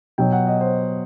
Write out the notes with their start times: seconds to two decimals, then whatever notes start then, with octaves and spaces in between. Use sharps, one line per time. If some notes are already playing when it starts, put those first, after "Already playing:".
0.18 B2 F#3 G5
0.32 F#5
0.47 D#5
0.61 C5